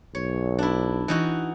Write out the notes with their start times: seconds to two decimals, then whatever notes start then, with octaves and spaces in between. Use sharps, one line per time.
0.15 B1 C#5
0.59 D4 E4
1.08 E3 D#4 F#4